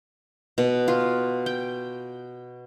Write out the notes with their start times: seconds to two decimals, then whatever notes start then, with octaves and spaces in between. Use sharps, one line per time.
0.58 B2
0.88 F4
1.46 G5